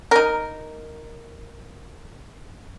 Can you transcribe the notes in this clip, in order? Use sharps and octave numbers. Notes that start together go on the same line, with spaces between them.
D#4 A#4